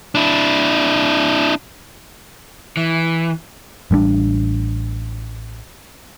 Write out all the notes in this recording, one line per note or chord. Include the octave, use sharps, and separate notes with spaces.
D4 E4
E3
A1 G3 G#3 D4